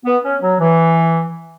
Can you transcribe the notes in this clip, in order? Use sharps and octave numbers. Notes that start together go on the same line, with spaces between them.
B3
C#4
F#3
E3